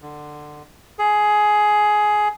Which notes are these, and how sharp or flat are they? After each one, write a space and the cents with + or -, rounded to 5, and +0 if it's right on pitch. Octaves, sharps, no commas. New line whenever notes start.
D3 +20
G#4 +15